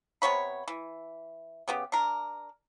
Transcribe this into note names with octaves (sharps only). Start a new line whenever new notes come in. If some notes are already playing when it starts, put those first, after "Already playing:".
C3 B3 C#5 B5
E3
C#3 B3 G4
D4 A#4